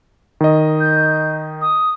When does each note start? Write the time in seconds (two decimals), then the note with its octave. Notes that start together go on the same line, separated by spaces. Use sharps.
0.41 D#3 D#5
0.80 G6
1.61 D#6